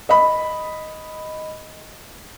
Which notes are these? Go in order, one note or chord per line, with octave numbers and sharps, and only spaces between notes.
D#5 B5